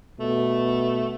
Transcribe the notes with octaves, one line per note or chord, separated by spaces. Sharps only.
B2 A3